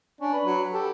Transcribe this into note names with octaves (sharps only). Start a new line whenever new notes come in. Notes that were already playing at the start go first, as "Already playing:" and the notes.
C#4 D4
B4
F#3
G4 A4